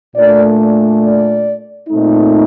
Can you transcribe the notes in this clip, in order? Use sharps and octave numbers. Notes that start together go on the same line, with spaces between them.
A#2 A3 D4 D5
D5
A#2 A3 C4 D#4